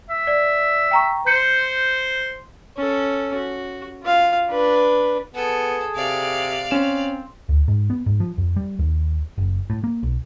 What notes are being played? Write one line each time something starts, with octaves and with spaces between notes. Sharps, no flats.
E5
D5
G5 A#5 C#6
C5 G6 C#7
C#4 A4
F#4
F4 F5
D4 B4
B3 G#4 A4
C3 D5 F5
C4 C#4 E7
D2
G#2
B3
G#2
F3
F2
G3
D#2
F#1
A2
A#3
B1